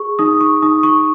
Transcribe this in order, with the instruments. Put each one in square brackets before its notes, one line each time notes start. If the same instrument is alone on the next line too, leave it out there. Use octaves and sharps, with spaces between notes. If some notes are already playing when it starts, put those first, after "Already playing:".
Already playing: [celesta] G#4 C#6
D#4 D#6
C#6
D#4 D#6
C#6